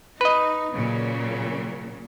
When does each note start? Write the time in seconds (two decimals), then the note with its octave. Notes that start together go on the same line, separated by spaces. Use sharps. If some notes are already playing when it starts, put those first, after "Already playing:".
0.21 D#4 B4 D#5
0.74 A#2 C#3 F#3